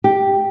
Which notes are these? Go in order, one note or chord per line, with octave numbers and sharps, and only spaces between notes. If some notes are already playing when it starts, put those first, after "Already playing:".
G4